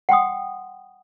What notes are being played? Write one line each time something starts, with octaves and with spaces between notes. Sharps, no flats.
F#5 G5 C6 D#6